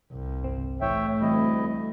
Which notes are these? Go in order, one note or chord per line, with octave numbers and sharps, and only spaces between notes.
C2
G1 C4
A2 E3 A3 C#5 E5 G5
D2 E3 G3 C4 E4 D#5